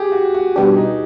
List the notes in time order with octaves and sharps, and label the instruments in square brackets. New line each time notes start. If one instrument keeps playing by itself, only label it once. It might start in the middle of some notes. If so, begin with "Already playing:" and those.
Already playing: [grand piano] G4 G#4
F#4
F#4
[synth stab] B2 G3 B3 D4 G4
[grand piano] D#4